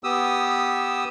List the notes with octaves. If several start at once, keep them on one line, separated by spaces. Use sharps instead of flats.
B3 G4 D#6 E6